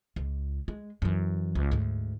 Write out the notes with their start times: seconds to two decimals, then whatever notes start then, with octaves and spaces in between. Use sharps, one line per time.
0.16 C#2
0.68 G#3
1.02 F#2 E3
1.55 C#2
1.71 D2 G#2